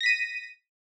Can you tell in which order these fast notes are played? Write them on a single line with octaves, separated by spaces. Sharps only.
A#6 B6 D#7